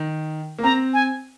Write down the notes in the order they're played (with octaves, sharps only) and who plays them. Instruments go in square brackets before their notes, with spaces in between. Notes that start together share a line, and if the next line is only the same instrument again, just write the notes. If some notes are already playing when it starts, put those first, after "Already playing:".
Already playing: [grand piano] D#3
A#3
[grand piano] C4 [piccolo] A#5
[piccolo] G#5